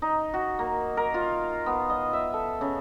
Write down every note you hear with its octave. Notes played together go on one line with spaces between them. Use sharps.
D#4
F#4
A#3
A#4
F4
B3
D#5
E5
A4
C#3